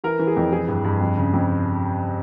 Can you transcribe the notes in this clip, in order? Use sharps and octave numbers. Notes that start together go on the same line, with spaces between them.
E3 A#4
E3
G#4
F2
E3 G#4
G2
G2
F2
C#3
F2